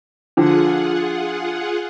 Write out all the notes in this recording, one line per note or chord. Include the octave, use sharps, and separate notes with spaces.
D3 F3 F4 G#4 F#5